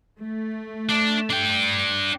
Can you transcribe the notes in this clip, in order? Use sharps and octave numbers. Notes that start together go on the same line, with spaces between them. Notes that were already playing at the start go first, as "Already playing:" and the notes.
A3
D4
D4 G5